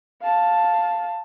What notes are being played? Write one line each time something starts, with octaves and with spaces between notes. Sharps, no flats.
F5 A5